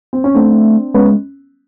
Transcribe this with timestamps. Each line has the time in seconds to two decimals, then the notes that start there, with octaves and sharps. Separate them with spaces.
0.13 C4
0.24 C#4
0.35 A3 C4 D4
0.94 G#3 B3 C#4